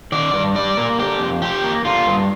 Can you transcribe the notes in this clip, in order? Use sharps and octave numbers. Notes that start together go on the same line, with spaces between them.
D#3 D5
G2
G3 D5
A#3
D3 G4
F2
F3 G4
A#3
D3 F4
G2